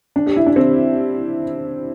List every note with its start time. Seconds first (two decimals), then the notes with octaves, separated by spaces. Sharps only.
0.16 D4
0.26 G4
0.36 E4
0.46 D4
0.56 C4